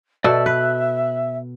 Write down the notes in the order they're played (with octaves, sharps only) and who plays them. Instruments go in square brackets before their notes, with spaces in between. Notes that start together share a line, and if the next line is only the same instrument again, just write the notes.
[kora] B2 A4 [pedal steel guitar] D5 E6 [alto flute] E5
[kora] B4 [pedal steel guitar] F#6